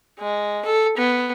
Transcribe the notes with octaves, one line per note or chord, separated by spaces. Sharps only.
G#3
A4
B3